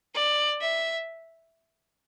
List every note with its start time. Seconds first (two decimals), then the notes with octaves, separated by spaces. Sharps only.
0.15 D5
0.61 E5